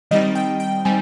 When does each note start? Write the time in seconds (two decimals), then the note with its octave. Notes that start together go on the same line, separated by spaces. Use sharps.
0.11 D#3 G3 C4 D#4 D#5
0.35 G5
0.60 G5
0.85 G3 C4 D#4 G#5